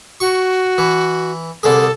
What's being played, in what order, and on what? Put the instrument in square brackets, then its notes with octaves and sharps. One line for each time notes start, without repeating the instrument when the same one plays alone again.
[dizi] F#4 [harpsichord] C#6
[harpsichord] E3
[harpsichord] C2 D3 G#4 [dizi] A4